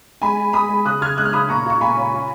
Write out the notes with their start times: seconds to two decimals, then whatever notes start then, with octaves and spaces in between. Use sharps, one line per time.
0.22 G#3 G#5 B5
0.37 G#3
0.53 G#3 B5 D#6
0.69 G#3
0.85 C#3 D#6 F#6
1.01 C#3 F6 G#6
1.17 G#3 D#6 F#6
1.25 F6
1.33 C#3 B5 D#6
1.49 A#2 A#5 C#6
1.66 F4 C#6
1.81 A#2 G#5 B5
1.96 C#4
2.13 F4